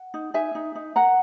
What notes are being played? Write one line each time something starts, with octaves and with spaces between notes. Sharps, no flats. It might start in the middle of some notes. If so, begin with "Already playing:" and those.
Already playing: F#5
D#4
D#4 E5 G#5
D#4
D#4
A#4 F#5 A#5